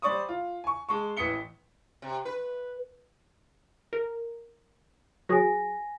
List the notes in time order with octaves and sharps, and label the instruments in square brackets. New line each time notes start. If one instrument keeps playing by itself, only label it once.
[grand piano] G3 C5 D5 C#6 D#6
F4
G#5 C#6
G#3 A5 C#6
A1 E3 D#6 B6 C#7 G7
[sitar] C3
B4
[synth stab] A#4
[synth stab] F#3 G#4 [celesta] G#5 A#6